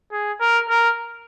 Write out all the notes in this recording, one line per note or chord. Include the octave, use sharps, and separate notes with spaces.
G#4
A#4
A#4